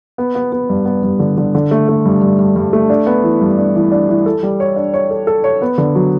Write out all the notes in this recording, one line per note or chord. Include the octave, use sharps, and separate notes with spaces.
B3
B3
B3
G2
B3
G2
D3
D3
D3
A3
A3
G2
G2
G2
G2
A3
D4
B3
E3
G2
D4
E3
D4
E3
A4
G3
C#5
D4
C#5
A4
A4
C#5
B3
D3
F#3